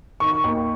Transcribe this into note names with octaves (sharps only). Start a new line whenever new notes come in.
D#3 C#6
D#2